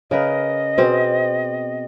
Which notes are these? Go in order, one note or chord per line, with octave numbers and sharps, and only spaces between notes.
C#3 A#4 B4 D#5
B2 C4 G#4